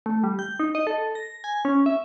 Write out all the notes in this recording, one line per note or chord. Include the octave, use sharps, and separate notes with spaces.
A3
G3
G6
D#4
D#5
A4
A#6
G#5
C#4
E5